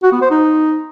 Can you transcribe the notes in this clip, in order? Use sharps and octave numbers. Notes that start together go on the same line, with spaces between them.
F#4
B3
C5
D#4